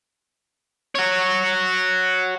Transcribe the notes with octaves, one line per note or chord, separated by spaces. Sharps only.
F#4 C#5